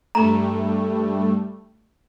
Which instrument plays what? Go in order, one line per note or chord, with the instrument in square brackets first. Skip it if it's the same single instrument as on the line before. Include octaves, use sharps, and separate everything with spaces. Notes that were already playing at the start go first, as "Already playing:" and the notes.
[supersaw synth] G2 G3 A3 [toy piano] A#5